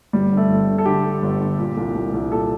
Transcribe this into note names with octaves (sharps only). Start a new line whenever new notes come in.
G1 G3
D3
A3
G1
D3
A4
D3 G4
D3
G1
D3
A#2
C2
C2
C2
A#2 A4